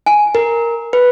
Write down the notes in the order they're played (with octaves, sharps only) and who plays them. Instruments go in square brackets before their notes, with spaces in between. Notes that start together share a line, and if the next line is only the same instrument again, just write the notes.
[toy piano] G#5
[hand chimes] A#4
B4